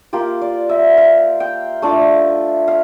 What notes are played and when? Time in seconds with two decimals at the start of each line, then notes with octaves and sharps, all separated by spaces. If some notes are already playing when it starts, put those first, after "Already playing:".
0.13 A#3 F4 G4
0.42 D5
0.69 E5
0.98 F5
1.40 G5
1.82 A3 D4 F4
2.68 F5